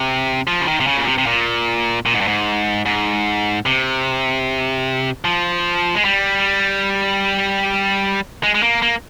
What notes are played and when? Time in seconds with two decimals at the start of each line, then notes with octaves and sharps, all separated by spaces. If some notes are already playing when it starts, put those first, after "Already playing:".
Already playing: C3
0.47 F3
0.61 C#3
0.67 D#3
0.80 C3
0.87 C#3
0.97 A#2
1.06 C3
1.18 C3
1.27 A#2
2.06 A#2
2.14 G#2
2.21 G2
2.27 G#2
2.86 G#2
3.66 C3
5.25 F3
5.95 G#3
6.05 G3
8.44 G#3
8.55 G#3
8.63 A#3
8.82 A#3